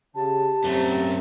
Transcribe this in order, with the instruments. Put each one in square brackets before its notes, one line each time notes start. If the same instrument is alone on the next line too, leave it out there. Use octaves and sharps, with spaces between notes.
[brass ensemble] C#3 [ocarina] G4 [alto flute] A5
[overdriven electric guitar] F#2 A3 [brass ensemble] C4 C#4